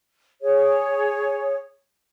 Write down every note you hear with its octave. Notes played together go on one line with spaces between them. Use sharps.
G#4 C#5